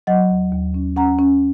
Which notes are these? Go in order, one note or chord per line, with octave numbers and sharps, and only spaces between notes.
F#3 D#5 F#5
D#2
D#2
C#4
C#4 F#5 A#5
C#4